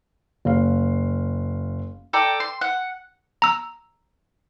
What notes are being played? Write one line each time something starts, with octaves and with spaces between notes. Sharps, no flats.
F#1 F5
A4 D5 G5 A#5
C6
F#5
A#5 E6